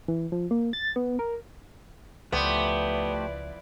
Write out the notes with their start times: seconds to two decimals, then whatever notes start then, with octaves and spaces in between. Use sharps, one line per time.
0.08 E3
0.32 F3
0.51 A#3
0.73 A6
0.96 B3
1.19 A#4
2.32 C#2 F3 A3 B3 E4 G4 C5 D5